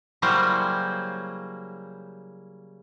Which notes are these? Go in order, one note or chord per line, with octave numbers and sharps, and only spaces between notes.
C#3 F#3 G3 A#3 E4 C5